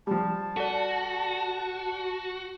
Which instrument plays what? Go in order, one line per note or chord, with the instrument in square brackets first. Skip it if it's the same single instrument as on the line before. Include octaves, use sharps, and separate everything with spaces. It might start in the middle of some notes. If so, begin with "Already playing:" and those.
[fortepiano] F3 G3 [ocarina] A5
[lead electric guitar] F#4 [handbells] A4 D5